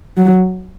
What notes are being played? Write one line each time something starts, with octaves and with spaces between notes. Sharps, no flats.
F#3